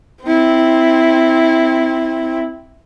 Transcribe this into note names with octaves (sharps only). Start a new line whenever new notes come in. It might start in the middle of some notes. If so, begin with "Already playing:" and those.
C4 E4